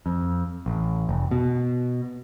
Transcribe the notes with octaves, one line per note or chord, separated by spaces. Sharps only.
F2
A1
F1
B2